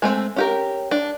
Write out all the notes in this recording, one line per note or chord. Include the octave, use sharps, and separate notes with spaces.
G#3 A3 C4
C#4 G4 A#4
D4